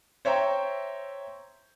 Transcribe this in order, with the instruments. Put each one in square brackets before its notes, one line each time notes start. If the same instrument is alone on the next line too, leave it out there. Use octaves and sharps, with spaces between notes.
[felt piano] C5 C#5 E5 G5 A#5